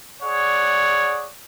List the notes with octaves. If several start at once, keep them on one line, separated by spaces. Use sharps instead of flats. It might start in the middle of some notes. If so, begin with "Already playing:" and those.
G#4 C#5 D5 F#5